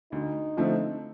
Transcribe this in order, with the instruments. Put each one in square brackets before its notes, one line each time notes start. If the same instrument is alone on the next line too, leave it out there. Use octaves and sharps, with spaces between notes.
[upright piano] D2 [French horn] D#4
[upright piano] D3 F3 A3 C4